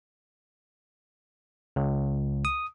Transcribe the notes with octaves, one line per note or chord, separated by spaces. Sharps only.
C#2
D#6